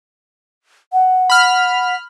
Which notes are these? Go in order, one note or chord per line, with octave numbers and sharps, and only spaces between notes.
F#5
B5 F6